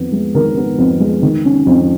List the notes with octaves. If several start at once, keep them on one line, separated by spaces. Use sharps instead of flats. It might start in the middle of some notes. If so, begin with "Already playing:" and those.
Already playing: F2 D#3 B3
G#3
D#3 A#4
B3
F2
G#3
D#3
C#4
F2